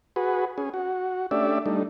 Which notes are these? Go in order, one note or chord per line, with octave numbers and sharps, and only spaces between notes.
F#4 G#4 B4
C#4 G#4
F#4
A3 C#4 D4 G4 D5 E5
G3 A3 D4 D#4